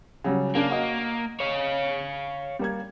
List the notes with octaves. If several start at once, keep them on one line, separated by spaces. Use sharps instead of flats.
C#3 F#3 G3
C#3 A#3 D4
F#4 D#5
C#5 F5
G3 A#3 G#6